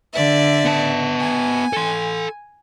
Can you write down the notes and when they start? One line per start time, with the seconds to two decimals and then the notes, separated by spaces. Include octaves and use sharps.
0.14 D3 D5 E5
0.65 B3 A5
1.19 G#5
1.73 A4 C6